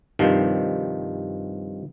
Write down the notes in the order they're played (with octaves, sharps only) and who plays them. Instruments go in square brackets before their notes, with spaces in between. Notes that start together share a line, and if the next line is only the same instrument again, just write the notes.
[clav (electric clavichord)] G2 C3 D#3 F3